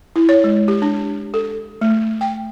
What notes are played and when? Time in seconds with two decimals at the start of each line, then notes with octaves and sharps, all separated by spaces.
0.16 E4
0.29 C#5
0.44 G#3
0.68 G4
0.82 D4
1.34 A4
1.81 A3
2.21 G5